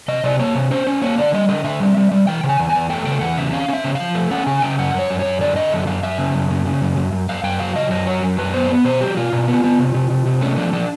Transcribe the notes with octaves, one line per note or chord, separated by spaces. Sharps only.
C3 D#5
C3 D5
A#3 C#5
C3
C#4 C5
C#4
A#3 C#5
D3 D5
G3 D#5
D3 D#5
D3 E5
G3
G3
G3
E3 G5
C#3
G#5
E2
G#5
E2
A3 G5
C#3 G5
E2 F#5
C#3 E5
C#4 F5
C#4 E5
C#3
F3 F5
A3
C#4 F#5
C#3 G#5
C#3 G5
F#2 F#5
F#2 C#5
F#2
C#5
F#2
D3 D5
D3 D#5
F#2 E5
F#2 F5
F#2 E5
C#3
F#2
C#3
C#3
F#2
F#2
F#2
F#2 F5
F#2 G5
F#3 F5
C#3 D#5
F#2 D#5
F#3 C#5
F#2
F#2 B4
B3 C5
B3
B2 C5
F#3 G4
B2 F4
B2
B3
B3
C3
C3
C3
C3
A3 C#4
F3 D4
F3 D4